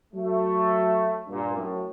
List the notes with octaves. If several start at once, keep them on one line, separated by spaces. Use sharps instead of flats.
F#3 A3
G2 A#2
F#2 A2